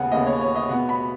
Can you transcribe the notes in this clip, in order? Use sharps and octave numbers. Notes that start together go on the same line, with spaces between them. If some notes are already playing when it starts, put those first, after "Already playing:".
Already playing: D#2 C#3 B3 F#5 G#5
D#2 C#3 B3 D#5
C#5
C#5
D#5
B2 B3 F#5
B5